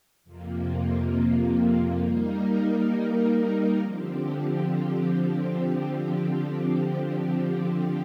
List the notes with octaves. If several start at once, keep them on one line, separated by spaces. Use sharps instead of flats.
F2 C3 F3 A#3
G3 A#3 D#4 A#4
D3 F3 C4 G4